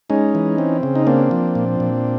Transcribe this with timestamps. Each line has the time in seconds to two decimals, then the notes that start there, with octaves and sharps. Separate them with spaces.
0.10 G#3 C#4 D#4
0.35 E3
0.58 C4
0.83 C#3
0.95 D#4
1.07 A#3 C4 D4
1.31 F3
1.55 A#2
1.80 A#2